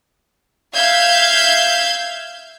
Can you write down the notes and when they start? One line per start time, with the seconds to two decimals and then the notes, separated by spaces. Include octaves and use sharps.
0.74 E5 F5 G6 G#6